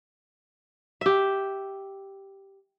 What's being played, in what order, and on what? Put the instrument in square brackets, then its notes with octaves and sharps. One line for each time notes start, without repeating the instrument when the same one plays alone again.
[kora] G4 E5